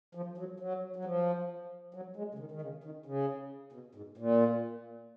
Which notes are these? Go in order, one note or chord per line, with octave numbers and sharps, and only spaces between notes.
F3
F#3
F#3
F#3
F3
F#3
G#3
C#3
D#3
D#3
C#3
D#3
C#3
B2
G#2
A#2